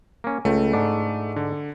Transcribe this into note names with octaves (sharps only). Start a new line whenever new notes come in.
A#3 C#4
C#2 A3
G#2 D4
D3